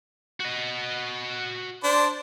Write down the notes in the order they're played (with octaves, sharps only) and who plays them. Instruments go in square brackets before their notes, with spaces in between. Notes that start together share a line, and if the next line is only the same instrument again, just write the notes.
[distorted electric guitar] F#4 D#5
[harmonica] D4 C5